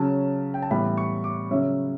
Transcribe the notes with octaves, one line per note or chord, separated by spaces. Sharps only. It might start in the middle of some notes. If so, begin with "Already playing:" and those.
Already playing: C#3 F#3 C#4 A5
G5
A5
A2 E3 G3 B3 B5
C#6
D6
C#3 F#3 C#4 E5